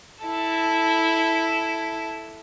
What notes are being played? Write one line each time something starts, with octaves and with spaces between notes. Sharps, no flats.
E4 A4